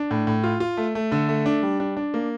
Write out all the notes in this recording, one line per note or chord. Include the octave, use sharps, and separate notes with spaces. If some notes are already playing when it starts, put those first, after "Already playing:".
Already playing: D4
A2
A2
F4
F4
A3
A3
D3
A3
D4
G3
D4
D4
A#3